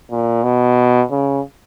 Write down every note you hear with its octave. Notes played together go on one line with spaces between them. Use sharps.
A#2
B2
C#3